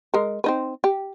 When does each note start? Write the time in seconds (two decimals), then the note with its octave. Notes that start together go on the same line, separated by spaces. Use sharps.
0.14 G#3 A#4
0.44 C4 D#4 B4
0.84 G4